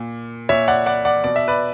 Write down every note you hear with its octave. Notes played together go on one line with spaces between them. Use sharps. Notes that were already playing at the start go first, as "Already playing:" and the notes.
Already playing: A#2
A#2 C#5 E5
D5 F#5
D5 F#5
D5 F#5
B2 D5
E5
B4 D5